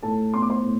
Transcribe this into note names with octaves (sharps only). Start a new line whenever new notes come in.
A2 A4 A5
B3 C6
D6
C5 C6
A2